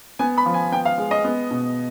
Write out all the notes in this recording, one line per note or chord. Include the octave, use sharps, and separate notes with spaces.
B3 G#5
B5
F3
G#5
B3 G5
F5
G#3
D#5
B3
B2